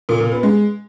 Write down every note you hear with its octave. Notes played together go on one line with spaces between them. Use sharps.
A#2
A#2
B3
G#3